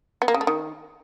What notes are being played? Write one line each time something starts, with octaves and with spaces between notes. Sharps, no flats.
B3
A#3
C#3
A3
D#3